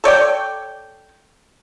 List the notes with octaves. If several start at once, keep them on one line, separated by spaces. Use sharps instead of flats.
A4 C#5 D5 G5